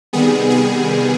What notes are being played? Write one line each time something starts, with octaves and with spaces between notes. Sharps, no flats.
C3 D#3 G3 B3 G#4
G#4